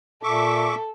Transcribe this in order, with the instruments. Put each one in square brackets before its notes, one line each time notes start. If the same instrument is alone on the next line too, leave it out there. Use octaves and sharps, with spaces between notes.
[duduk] A#2 [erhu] A4 [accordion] E5 C#6 D6